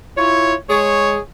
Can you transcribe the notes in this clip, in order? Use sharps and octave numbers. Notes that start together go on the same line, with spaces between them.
E4 F4 C#5
G#3 G#4 C#5